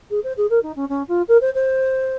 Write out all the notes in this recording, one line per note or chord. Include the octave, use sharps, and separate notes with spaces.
G#4
C5
G#4
A#4
D#4
C#4
C#4
F4
A#4
C5
C5